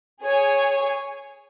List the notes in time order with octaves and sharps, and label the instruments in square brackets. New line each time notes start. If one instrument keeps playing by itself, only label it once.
[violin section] G#4 C#5 G#5